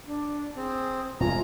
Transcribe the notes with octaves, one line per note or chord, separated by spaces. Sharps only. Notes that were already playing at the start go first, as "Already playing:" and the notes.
D4
C4 G#4
E1 C2 G#3 F4 G#5 A#5